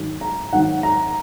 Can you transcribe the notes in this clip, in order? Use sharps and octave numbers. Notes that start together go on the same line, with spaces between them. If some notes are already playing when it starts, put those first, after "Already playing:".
Already playing: G#2 D#3 F#3
A#5
G#2 D#3 F#3 F#5
A#5